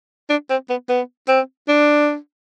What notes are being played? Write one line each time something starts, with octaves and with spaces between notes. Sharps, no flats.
D4
C4
B3
B3
C4
D4